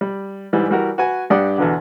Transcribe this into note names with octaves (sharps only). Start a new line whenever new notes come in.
G3
G#2 E3 G3
E3 G3 F#4 A#4
F#4 B4 G#5
G2 D4 G4 D5 F#5 D#6
E2 B2 D3